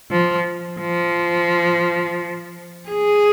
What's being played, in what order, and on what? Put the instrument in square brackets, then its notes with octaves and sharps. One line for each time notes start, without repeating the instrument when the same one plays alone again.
[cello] F3
F3
G#4